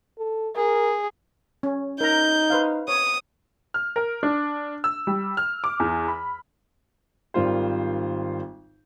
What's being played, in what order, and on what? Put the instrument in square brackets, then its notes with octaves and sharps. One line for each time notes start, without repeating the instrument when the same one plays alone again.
[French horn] A4
[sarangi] G#4 [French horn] A#4
[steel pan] C#4
[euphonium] D#4 [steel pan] A#4 A#5 [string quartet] G6
[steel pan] B4 C5 F5
[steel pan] C#5 [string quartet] D#6
[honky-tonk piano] F6
A#4
D4
E6
G3
F6
D6
E2
B5
[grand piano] G#1 D#3 G3 F4 C5